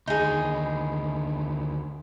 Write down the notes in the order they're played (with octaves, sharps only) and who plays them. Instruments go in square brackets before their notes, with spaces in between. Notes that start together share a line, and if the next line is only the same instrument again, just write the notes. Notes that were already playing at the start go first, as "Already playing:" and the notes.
[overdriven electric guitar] D2 D#3 [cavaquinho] D#4 G#4